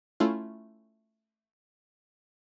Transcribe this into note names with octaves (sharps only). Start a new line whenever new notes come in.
A3 C#4 E4 F4